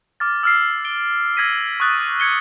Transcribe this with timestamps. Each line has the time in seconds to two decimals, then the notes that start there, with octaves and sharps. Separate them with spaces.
0.20 D6 F6 A6
0.43 E6 F6 C7
0.85 D7 G7
1.37 E6 G#6 A#6 B6 D#7
1.80 C#6 D#6 F#6 A6
2.20 G#6 C#7 G7